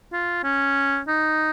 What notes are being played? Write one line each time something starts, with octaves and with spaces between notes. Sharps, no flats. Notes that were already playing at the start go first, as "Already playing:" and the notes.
F4
C#4
D#4